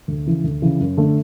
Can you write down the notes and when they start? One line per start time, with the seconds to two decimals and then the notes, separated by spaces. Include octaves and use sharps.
0.08 D2
0.26 C#3 E3
0.44 D2
0.62 C#3 E3
0.80 F#2
0.98 D3 A3